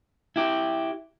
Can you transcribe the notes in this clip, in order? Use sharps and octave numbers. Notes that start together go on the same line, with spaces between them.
E4 G4